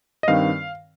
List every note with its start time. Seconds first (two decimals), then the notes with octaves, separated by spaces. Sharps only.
0.23 D#5
0.28 G2 D#3 C4 F5